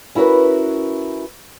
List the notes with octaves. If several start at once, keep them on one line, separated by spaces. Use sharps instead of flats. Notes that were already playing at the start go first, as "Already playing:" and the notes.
C#4 E4 F#4 A#4 B4